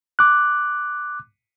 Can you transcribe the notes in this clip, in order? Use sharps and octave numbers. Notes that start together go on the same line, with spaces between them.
D6 F#6